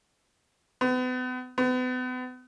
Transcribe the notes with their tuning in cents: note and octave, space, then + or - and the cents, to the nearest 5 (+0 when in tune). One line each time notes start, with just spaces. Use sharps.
B3 +40
B3 +40